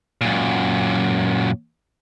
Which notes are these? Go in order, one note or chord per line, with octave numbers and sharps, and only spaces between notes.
F#2 A#2